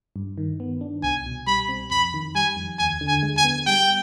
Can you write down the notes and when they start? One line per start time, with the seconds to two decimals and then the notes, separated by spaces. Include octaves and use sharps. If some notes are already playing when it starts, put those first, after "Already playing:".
0.16 G2
0.38 D#3
0.60 B3
0.81 D4
1.03 C2 G#5
1.26 B2
1.47 G3 B5
1.69 C4
1.91 F2 B5
2.14 D#3
2.35 G3 G#5
2.57 F2
2.79 D#2 G#5
3.01 D3
3.08 G#5
3.23 G#3
3.37 G#5
3.44 B3
3.66 G3 G5